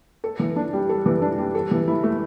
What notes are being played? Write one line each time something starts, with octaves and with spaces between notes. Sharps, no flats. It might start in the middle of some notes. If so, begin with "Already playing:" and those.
A4
E3
D4
G3
A4
E3
D4
G3
A4
E3
E4
A3